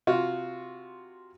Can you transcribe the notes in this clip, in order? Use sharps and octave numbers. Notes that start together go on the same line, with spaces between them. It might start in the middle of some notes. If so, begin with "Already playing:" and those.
C3 F4 F#4